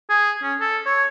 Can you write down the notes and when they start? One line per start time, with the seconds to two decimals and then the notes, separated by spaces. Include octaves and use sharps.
0.10 G#4
0.42 C#4
0.60 A4
0.86 C#5